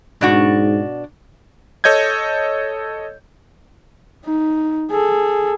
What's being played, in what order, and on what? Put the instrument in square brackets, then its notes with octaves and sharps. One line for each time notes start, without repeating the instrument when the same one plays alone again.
[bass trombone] G#2 [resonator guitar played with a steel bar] B2 D4 F#4
[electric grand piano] A4 C#5 D#5 G6 G#6
[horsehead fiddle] D#4
G#4 A4